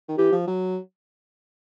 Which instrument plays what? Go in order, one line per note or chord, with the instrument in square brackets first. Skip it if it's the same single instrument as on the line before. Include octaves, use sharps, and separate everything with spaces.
[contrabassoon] D#3
[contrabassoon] E3 [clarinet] G4
[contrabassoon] F3
F#3